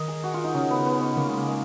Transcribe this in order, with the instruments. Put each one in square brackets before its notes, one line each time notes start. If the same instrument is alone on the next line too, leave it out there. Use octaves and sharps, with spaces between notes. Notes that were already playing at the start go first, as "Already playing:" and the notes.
Already playing: [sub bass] D#3 [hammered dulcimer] A#4 D#5
[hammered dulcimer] G#4
F#4
F4
D#4
[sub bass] C#3 [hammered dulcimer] C#4
[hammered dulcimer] B3
B3
C#4
[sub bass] C#3 [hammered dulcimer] A#3
[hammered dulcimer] G#3
A#3
G#3